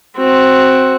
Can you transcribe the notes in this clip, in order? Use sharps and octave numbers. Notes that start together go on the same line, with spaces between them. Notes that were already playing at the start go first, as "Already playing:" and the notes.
C4 F#4